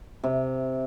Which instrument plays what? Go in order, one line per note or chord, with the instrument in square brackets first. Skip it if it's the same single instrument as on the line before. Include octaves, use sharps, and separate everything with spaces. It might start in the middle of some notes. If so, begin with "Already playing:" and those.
[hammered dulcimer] C3